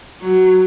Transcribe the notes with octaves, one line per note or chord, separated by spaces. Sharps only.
F#3